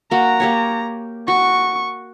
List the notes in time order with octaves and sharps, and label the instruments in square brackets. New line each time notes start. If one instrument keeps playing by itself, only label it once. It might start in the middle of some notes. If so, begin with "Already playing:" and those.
[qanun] A#3 F#4 [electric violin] A#5
[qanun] A#3 G4 C#5
[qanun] F#4 [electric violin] C#6